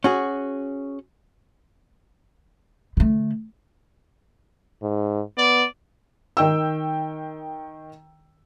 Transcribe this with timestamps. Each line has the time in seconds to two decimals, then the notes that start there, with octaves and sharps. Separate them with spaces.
0.04 C#4 F#4 G#4
2.97 D3 A3
4.82 G#2
5.38 B3 D5
6.37 D#3 G5 E6